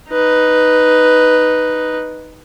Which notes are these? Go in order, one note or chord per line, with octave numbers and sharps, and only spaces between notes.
D#4 B4